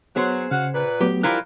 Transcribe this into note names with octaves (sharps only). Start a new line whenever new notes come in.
F#3 B3 G#4 C5
C#3 F#4 F5 F#5
A#2 B4
F#3 A3 B3 G4
E3 F3 G3 E4 F4 A#4 F#6